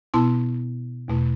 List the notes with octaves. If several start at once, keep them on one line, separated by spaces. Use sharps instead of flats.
B2 B3 E4 A5 C6
E2 B2 A3 E4